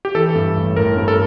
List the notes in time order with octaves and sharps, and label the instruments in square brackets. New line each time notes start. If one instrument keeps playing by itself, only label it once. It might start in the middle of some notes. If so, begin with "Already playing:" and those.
[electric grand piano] G4
[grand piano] E3 [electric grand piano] A4
[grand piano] G2
A1
[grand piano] A1 [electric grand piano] A#4
[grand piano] G2
[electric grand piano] A4